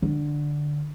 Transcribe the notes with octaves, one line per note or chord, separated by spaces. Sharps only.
D3